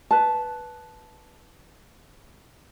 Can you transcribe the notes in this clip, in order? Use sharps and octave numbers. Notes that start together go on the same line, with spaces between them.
B4 A5